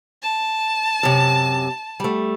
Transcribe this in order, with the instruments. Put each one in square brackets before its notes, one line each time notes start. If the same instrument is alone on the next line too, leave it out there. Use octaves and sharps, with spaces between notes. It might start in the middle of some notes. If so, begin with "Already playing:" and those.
[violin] A5
[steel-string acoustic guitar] F#2 C3
G3 A3